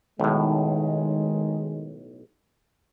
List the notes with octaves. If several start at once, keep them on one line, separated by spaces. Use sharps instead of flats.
B1 A2 D#3 G#3